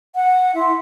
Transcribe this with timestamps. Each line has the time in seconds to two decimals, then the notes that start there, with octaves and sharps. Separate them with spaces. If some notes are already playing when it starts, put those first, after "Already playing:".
0.15 F#5
0.54 E4 E5 C6